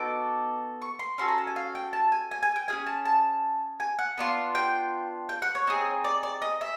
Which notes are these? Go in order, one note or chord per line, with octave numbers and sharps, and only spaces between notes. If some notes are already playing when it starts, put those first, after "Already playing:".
Already playing: B3 D#4 F#4 A4 D6
C#6
C6
C#4 F#4 A4 C6
A#5
A5
G#5
F5
G5
A5
G#5
G#5
G#5
G5
C#4 F4 G#4 G#5
A5
A5
G#5
F#5
B3 D4 F4
G5
G5
F#5
C#5
C4 D#4 G#4
D5
D5
D#5
E5